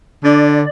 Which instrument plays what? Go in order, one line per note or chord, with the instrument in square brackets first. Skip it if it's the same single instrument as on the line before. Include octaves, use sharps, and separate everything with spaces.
[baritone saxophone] D3 [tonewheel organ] D5